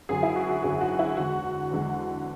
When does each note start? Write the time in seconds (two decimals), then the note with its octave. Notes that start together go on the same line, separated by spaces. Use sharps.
0.09 G#1 F#2 D3 F#3 G#4
0.23 E4
0.36 F#4
0.49 F#4
0.63 G#1 F#2 D3 F#3 G#4
0.81 F#4
0.99 E4
1.17 E2 D3 G#3 F#4
1.71 E2 D3 G#3